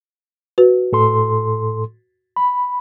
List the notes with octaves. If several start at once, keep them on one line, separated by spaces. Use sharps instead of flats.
F#4 B4
A2 A4 C6
B5